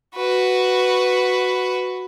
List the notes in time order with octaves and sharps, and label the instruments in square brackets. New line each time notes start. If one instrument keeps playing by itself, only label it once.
[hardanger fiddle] F#4 B4